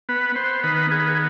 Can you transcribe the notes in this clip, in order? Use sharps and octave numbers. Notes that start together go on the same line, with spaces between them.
B3 B4
B3 C5
D#3 B4
B3 G#4
B4
G#4